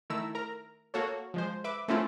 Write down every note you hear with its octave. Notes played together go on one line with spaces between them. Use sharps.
D#3 A3 E4 A#5 E6 E7
A#4 A#5
A#3 F#4 A4 C#5
F3 G#3 C5
B4 E5 D6
A3 A#3 C4 C#4 E4 F4